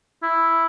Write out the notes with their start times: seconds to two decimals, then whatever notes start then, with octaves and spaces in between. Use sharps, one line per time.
0.23 E4